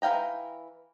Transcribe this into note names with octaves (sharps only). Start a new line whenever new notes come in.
E3 A4 F5 G5 A#5